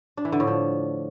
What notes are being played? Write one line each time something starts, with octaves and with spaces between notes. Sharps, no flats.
D4
E3
D3
A2
F3